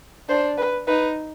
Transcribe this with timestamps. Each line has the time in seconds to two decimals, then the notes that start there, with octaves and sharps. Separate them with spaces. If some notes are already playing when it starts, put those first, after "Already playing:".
0.29 D4 C5
0.58 B4
0.87 D#4 B4